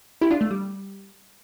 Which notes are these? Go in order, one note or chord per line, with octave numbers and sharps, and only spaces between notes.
E4 G4
D4 F4
A3
G3